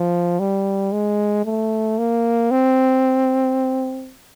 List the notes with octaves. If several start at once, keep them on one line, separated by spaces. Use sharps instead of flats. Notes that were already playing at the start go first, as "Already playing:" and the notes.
Already playing: F3
G3
G#3
A3
A#3
C4